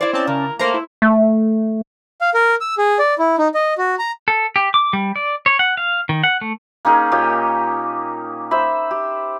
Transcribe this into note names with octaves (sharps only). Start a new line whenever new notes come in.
E4 C5 D5
C4 C#4 D5 A5
C#3 A#4
A3 A#3 A#4 C5 A#5
E4
A3
F5
A#4
E6
G#4
D5
E4
D#4
D#5
F#4
A#5
A4
G4
D6
G3
D5
C#5
F#5
F5
D#3
F#5
A3
A#3 C#4 D#4 G#4
A#2 G4 C#5 D#5
C5 E5 B5
G4